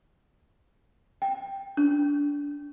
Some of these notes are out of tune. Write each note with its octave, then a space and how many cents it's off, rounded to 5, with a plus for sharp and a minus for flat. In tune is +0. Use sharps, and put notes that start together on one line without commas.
G5 +5
D4 -20